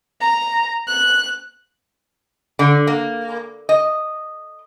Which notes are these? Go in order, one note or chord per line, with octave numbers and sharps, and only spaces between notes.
A#5
F#6
D3
A#3
D#5